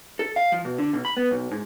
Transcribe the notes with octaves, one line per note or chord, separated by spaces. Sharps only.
A4
F5
F3
B2
D3
B1
B5
B3
B1
G#2